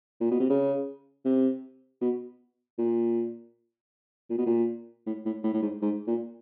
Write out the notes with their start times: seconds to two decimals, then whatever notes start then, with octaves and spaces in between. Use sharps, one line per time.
0.21 A#2
0.31 B2
0.40 C3
0.50 C#3
1.25 C3
2.01 B2
2.78 A#2
4.30 A#2
4.38 B2
4.46 A#2
5.06 A2
5.25 A2
5.43 A2
5.54 A2
5.62 G#2
5.82 G#2
6.07 A#2